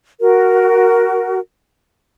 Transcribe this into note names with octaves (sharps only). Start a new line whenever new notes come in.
F#4 A#4